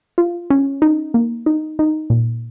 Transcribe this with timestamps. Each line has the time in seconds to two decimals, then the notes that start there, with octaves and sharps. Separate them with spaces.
0.18 F4
0.50 C#4
0.82 D#4
1.14 A#3
1.46 D#4
1.79 D#4
2.10 A#2